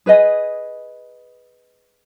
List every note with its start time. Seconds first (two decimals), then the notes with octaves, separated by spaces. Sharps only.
0.06 G#4 B4 D#5 G#5